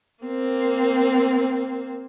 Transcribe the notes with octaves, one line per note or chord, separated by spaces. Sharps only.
A#3 C4